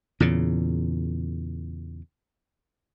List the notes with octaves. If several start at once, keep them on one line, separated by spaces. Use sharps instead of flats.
E2 A#2 C#3